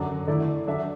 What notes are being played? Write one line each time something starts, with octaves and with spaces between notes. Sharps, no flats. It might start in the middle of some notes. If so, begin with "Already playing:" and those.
Already playing: F#2 D3 F#3 D4
D3 A3 E4 D5
F#3 D4 A4 E5